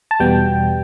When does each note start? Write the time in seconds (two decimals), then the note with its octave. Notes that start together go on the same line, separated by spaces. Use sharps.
0.11 A5
0.20 E2 B2 G3 B3 G5